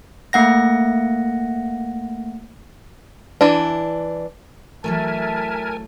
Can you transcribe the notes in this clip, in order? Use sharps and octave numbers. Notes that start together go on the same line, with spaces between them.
A3 A#3 F#5 A#6
E3 D4
E3 F#3 A3 A#4 E5 G#5 A5